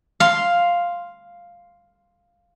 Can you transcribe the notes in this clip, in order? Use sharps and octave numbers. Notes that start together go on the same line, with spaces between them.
F5 C6